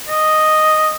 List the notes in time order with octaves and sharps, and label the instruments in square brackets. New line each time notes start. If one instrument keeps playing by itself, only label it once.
[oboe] D#5